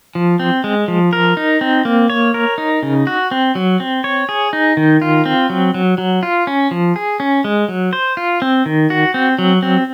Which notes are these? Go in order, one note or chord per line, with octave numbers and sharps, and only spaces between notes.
F3
C4
G#3
F3
A#4
D#4
C4
A#3
C#5
A#4
D#4
C#3
F#4
C4
F#3
C4
C#5
G#4
D#4
D#3
F4
C4
F#3
F#3
F#3
F4
C#4
F3
G#4
C#4
G#3
F#3
C5
F4
C4
D#3
F#4
C4
F#3
C4